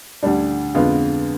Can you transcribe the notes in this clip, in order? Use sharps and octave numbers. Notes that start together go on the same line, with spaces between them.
D2 D3 G3 D4
F2 D3 G#3 B3 F4